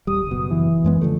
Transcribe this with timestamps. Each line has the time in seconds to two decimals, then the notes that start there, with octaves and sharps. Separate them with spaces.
0.07 D#1 G3 D#6
0.27 F#1 B2
0.50 E3
0.84 F#2 G#3 B3
1.01 D3 F3 A3